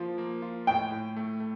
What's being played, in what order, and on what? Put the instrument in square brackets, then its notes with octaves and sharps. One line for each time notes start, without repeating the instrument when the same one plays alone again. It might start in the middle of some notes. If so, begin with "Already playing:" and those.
Already playing: [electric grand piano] F3 A#3 F4
A#3
F4
[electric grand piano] A2 [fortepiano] G5
[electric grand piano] A2
A3
A3